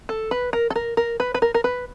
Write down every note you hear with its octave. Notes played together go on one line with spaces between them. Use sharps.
A4
B4
A#4
A4
A#4
A#4
B4
B4
A#4
A#4
B4